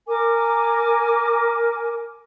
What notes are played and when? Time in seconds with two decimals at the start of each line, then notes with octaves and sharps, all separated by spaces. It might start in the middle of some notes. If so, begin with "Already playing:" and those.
0.07 A#4 G#5 D6